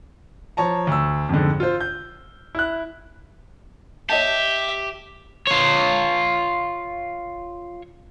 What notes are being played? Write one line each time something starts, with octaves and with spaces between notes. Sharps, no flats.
F3 C#5 A5 A#5
D2 E6
F2 G#2 D3
F4 C5
G6
E4 F#6
G4 C#5 D#5 E5 A5
F4 C#5